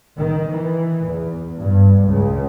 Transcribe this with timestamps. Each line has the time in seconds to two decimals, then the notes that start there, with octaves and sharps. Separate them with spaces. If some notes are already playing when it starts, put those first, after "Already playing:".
0.18 D#3
0.54 E3
1.08 E2
1.61 G2
2.09 C#2